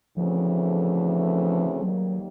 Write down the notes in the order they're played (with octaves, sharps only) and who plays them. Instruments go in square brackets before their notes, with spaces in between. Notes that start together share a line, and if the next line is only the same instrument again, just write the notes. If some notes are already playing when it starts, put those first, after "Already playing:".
[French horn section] D2 C#3 E3 A3 C4 [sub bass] F3
[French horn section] D#2 D#3 G3 A#3 [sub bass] F#3